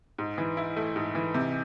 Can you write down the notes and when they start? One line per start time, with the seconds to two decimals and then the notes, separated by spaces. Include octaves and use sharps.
0.18 G#2
0.38 E3
0.57 E4
0.77 A3
0.96 G#2
1.15 E3
1.34 C3